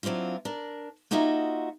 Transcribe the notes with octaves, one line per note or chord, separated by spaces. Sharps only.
F#3 C4 D4 E4 F4
D4 A#4
A#3 D#4 F4 F#4 D#5 E5